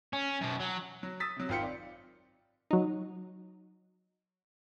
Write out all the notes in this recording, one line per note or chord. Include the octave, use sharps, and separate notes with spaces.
C#4
F#2 B2
F#3
F#3
D#6 E6 A6 B6
C3 F#3
G#1 C4 F4 G5 C#7
D5
F#3 D#4